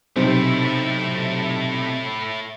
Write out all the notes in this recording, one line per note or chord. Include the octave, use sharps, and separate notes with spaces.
B1 C3 A3 E4 C5